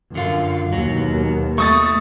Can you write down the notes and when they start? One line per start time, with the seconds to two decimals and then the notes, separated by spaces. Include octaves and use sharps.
0.15 F#2 D3 F4
0.73 D#2 B2 F#3
1.58 A3 C#6 D#6 A6